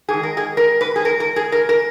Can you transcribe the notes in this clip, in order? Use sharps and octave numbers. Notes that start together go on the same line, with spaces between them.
G#2 D#3 G#4
A#4
G#4
A#4
B4
G#4
A#4
A#4
G#4
A#4
A#4